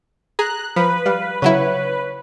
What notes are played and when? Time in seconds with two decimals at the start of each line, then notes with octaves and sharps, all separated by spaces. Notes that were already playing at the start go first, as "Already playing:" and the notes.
0.39 G#4 A#5 F#6
0.76 F3 B4 B5
1.06 G3 F5
1.42 C#3 F#3 E4 C#5